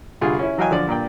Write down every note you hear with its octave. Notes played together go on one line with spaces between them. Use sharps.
C2 D3 F4 G#4
C#4 E4
E3 F#3 D#5 F5 G5 G#5
D3 F3 D5
G2 A#2 D5 G5